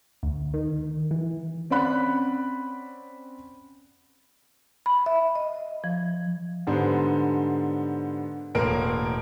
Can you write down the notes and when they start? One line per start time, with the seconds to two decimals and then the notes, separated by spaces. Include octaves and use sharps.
0.23 D2
0.54 D#3
1.11 E3
1.70 C4 C#4 D5 F#5 B5 F#6
4.86 B5
5.06 E5
5.35 D#5
5.84 F3
6.67 G#2 D3 G3 B3 C5
8.55 E1 A2 A#3 A#4 C6 D7